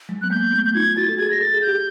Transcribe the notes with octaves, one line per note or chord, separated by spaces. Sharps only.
F#3 G#3
B3 F#6
G#3 A#3 G6
A3 B3
G6
D#4 F4 G#6
E4 F#4 A6
A4
F#4 G#4 G#6
A#6
A4 A6
G#4
G6
G4